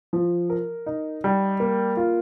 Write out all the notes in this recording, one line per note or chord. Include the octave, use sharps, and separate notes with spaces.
F3
A#4
D#4
G3
A#3
F4